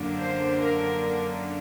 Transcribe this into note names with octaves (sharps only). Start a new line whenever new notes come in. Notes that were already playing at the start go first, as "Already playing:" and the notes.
Already playing: F#2 D3 F#3 A#3 D4
C5
A#4